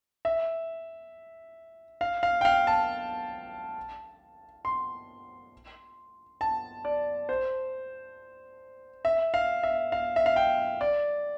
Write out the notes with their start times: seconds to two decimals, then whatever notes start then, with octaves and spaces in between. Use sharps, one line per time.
0.25 E5
2.01 F5
2.23 F5
2.41 G5
2.45 F5
2.67 A5
4.65 C6
6.41 A5
6.85 D5
7.29 C5
9.05 E5
9.34 F5
9.63 E5
9.92 F5
10.16 E5
10.26 F5
10.36 G5
10.81 D5